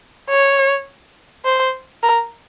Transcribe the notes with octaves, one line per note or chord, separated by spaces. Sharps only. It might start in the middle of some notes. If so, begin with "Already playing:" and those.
C#5
C5
A#4